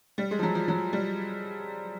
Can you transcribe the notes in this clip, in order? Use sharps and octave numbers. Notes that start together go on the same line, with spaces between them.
G3
G#3
F3
F#3
F3
F#3
G3